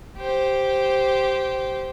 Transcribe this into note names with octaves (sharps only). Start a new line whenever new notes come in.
G4 C5